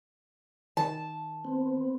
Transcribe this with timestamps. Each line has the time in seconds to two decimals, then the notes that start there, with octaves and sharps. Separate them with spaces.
0.77 D#3 A5
1.45 B3 C4